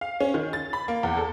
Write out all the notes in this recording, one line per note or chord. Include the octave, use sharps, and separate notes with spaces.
F5
C#4
D#3
A6
B5
A#3
E2
A4